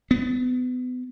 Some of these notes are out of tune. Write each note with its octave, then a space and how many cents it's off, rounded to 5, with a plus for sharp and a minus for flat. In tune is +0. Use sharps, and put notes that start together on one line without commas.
B3 +30